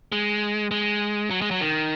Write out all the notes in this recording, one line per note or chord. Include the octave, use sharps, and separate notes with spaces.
G#3
G#3
F#3
G#3
F#3
D#3